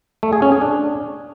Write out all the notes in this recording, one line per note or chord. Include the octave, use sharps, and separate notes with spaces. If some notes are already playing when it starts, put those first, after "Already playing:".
A3
G#4
C#4
G#4
D4